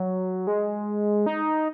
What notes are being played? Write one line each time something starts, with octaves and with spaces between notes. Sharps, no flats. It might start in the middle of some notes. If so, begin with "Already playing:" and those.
Already playing: F#3
G#3
D#4